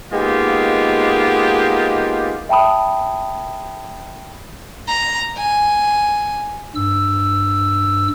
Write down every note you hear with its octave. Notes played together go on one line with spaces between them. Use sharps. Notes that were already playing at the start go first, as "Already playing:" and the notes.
G#3 A#3 B3 D#4 F4 G4
E5 G5 A5 B5 D#6
A#5
G#5
G2 E6